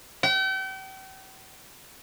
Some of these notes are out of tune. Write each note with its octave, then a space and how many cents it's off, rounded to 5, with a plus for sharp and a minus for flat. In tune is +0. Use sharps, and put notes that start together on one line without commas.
G5 -40